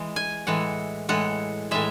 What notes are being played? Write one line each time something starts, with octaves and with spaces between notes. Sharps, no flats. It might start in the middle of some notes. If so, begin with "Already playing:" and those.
Already playing: E3 G#3
G#5
A2 E3 G#3 F#5
A2 E3 G#3 F#5
A2 E3 G#3 E5